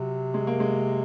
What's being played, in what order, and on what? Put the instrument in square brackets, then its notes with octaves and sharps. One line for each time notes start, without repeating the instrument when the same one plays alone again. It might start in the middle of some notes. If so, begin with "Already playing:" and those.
Already playing: [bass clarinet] C3 [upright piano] F#3
[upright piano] G#3
A#3
G#3